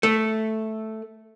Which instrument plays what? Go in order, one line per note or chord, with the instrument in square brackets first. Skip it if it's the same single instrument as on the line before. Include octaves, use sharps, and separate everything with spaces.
[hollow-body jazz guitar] A3